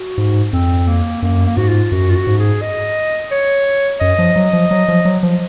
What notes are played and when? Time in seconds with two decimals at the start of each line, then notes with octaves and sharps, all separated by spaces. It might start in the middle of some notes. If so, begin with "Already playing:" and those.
Already playing: F#4
0.18 G#2
0.53 F2 C4
0.87 A#3
1.22 F#2 A#3
1.46 A#3
1.57 G#2 F#4
1.69 F4
1.92 F#2 F#4
2.10 F4
2.15 F#4
2.27 G#2
2.39 G#4
2.62 D#5
3.31 C#5
4.00 F#2 D#5
4.19 F3
4.36 F#3
4.53 F3
4.71 F#3
4.88 F3
5.05 F#3
5.23 F3